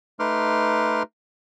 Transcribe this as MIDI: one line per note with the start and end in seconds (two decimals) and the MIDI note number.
0.19 1.03 57
0.19 1.03 63
0.19 1.03 71
0.19 1.03 84
0.19 1.03 86
0.19 1.03 89